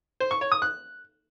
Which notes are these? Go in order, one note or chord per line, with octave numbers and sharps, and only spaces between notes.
C5
C#6
C#5
D#6
F#6